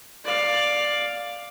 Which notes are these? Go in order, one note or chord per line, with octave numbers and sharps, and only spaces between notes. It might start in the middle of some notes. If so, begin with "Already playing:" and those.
D5 F5